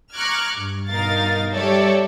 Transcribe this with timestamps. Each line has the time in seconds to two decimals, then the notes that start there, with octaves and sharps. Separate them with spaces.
0.15 A#5 C#6 D6 F6 F#6 G#6
0.57 G2
0.89 G2 B2 D#4 A#4 F5 A6
1.55 G3 G4 A4 C#5 D5 E5